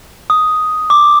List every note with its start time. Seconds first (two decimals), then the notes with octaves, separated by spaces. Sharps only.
0.30 D#6
0.90 D6